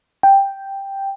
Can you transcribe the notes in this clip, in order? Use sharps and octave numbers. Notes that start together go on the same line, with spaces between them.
G5